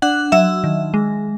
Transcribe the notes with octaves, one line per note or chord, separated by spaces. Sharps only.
D4 F#5 F#6
F#3 E5 E6
D#3
G#3